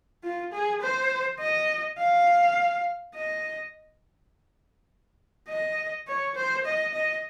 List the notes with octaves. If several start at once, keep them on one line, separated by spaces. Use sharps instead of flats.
F4
G#4
C5
D#5
F5
D#5
D#5
C#5
C5
D#5
D#5